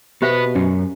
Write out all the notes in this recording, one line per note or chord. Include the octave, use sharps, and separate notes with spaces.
B2 B3 G4 B4 C5 E5
F#2 C#4